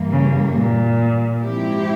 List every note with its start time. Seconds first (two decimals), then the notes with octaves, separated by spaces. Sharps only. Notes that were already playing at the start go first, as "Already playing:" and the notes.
Already playing: G2 E3 A#3
0.11 C#3
0.55 A#2
1.41 G#2 F3 C4 E4 G4